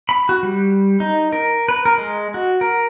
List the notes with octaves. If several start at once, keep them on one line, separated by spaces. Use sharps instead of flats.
B5
F#4
G3
D#4
A#4
B4
A#4
G#3
F#4
A#4